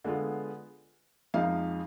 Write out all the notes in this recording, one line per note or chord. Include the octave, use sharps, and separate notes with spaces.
D3 G#3 B3 F4
F2 F3 G#3 D#4 F5